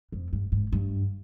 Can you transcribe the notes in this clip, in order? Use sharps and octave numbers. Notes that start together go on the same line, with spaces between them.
F2
G2
G#2
G2